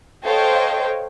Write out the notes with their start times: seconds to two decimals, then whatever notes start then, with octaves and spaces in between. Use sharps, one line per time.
0.23 A4 C5 C#5 D#5 F5 G5